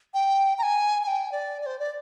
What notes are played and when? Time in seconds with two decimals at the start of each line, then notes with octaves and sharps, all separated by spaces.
0.14 G5
0.58 A#5
0.63 G#5
1.03 G#5
1.07 G5
1.32 D5
1.61 D5
1.66 C5
1.79 D5